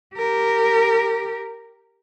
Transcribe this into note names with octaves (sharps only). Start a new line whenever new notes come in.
G4 A#4